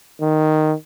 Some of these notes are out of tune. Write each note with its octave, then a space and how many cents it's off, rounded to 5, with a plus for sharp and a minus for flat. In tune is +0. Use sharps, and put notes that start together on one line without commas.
D#3 -5